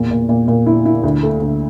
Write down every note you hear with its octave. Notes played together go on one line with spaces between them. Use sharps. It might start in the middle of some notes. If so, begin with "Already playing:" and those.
Already playing: E2 A#2
A#2
A#2
A#2
E4
E4
D2
A3
D2